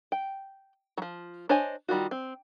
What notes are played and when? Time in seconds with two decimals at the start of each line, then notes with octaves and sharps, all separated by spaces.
0.12 G5
0.98 F3 F#3
1.49 D4 C5 C#5 D#5 G#5
1.88 D#3 G3 F4 F#4
2.11 C4